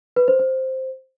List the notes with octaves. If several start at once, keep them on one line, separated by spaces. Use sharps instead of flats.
B4
C5
C5